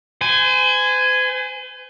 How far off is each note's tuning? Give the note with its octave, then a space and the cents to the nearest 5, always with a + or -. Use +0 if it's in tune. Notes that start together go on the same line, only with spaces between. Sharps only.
C5 -40 G#5 +0